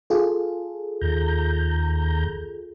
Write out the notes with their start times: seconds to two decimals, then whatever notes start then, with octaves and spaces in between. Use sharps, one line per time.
0.10 F4 G#4 A4
1.01 D#2 A#5 G6